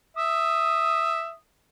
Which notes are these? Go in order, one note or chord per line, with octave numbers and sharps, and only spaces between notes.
E5 D#6